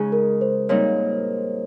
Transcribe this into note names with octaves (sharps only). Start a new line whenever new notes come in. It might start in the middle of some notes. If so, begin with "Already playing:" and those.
Already playing: C#3 G#3 D#4 G#4
A#4
C5
A#2 G3 C4 D#4 C#5